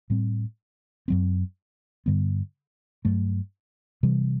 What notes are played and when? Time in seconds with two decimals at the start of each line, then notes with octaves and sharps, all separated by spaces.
0.10 A2 G3 C4
1.08 F#2 F#3 C4
2.06 G2 D3 G3 B3
3.05 G2 F#3 A3
4.03 C3 E3 G3